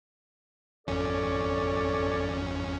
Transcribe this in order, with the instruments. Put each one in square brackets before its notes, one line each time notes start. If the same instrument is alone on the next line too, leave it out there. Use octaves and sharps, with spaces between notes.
[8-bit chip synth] G#1 F2 C#4 [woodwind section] A4 C#5 D5